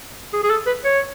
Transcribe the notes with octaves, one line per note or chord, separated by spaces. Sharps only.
G#4
G#4
A4
B4
C#5